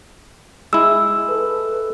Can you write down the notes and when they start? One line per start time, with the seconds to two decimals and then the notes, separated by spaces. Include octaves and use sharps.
0.73 G#3 E4 E6
1.29 A4 B4